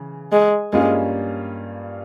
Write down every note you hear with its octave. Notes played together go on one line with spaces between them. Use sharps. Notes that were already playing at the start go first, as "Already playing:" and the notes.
Already playing: C#3 E3
G#3
G2 G3 G#3 A#3 C#4 F4